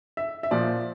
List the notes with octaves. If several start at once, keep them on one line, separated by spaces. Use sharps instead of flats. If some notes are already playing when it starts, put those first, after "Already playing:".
E5
E5
A#2 F3 D5